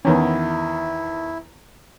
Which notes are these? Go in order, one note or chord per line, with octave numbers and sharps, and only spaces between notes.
E2 D#3 B3 C#4 E4